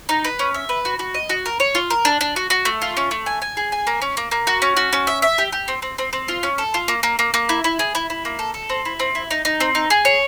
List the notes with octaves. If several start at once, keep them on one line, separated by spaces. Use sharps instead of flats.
D#4
B4
C#4
E5
B4
F#4
F#4
D#5
F#4
A#4
C#5
F4
A#4
D4
D4
F#4
F#4
A3
F4
C#4
A3
G#5
G#5
G#4
G#5
A#3
C#4
A#3
A#3
F#4
C#4
F#4
C#4
E5
E5
G4
G4
C4
C4
C4
C4
F4
C#4
A4
F4
A#3
A#3
A#3
A#3
E4
E4
G#4
E4
E4
A#3
A4
A4
C4
E4
C4
E4
D#4
D#4
C4
D#4
G#4
C#5